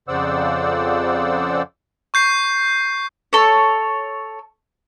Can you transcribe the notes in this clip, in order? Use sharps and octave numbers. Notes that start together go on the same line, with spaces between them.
F2 C#3 C5 D5 F#5 E6
C#6 G6 C7
A4 C#5